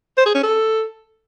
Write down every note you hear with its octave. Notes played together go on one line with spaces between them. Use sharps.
C5
G#4
C#4
A4